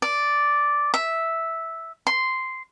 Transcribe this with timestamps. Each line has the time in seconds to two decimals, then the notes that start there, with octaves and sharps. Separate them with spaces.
0.02 D5
0.94 E5
2.07 C6